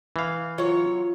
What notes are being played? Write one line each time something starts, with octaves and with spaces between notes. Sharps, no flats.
E3 F5
F#3 F4 C#5